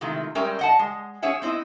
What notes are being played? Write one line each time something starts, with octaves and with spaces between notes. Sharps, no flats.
C3 D#3 G#3 A3 E4 F4
G3 G#3 C#4 A#4 E5 G5
D#5 F#5 A5
G#3
C#4 G#4 C#5 E5 F#5 G#5
B3 C4 E4 D#5